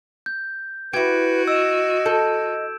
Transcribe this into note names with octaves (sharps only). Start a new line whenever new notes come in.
G6
E4 F#4 G4 B4 G#6 D7
D#5 E6 D7 E7
A4 G6